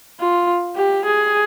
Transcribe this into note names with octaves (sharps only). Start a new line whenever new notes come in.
F4
G4
G#4